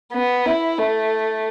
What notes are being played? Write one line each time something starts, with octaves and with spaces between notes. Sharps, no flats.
B3
E4
A3